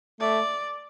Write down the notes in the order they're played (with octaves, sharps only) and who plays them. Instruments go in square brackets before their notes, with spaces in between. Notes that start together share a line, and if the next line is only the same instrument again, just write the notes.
[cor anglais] A3 [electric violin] D5